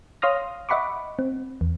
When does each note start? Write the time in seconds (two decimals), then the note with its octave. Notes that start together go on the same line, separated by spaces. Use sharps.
0.22 C#5 F5 C6 D#6 F6 A#6
0.69 D#5 E5 F#5 B5 C#6 D6
1.19 C4
1.61 E2